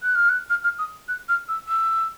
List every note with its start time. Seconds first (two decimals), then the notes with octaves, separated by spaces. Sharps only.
0.03 F#6
0.15 F6
0.29 F#6
0.50 F6
0.64 F6
0.79 D#6
1.08 F#6
1.29 F6
1.49 E6
1.68 E6